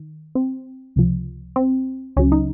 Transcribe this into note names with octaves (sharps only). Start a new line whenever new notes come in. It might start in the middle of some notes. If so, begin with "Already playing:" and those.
Already playing: D#3
C4
C#2 C3 F3
C4
C#2 C#3 F#3 C#4
D#4